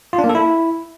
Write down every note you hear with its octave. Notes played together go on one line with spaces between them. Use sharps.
F4
D4
A#3
A4
E4